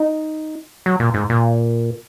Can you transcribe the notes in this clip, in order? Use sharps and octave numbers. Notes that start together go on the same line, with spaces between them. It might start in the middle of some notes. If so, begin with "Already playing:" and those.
Already playing: D#4
F#3
A#2
G#2
A#2